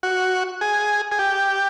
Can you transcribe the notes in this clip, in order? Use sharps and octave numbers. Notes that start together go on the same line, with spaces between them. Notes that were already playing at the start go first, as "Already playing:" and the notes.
F#4
G#4
G#4
G4